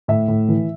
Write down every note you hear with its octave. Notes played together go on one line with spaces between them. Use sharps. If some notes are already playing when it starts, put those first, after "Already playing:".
A2 E5
A2
E3